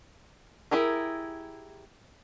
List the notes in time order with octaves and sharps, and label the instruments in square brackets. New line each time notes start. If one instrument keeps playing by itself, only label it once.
[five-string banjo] E4 G4 G#4 A#4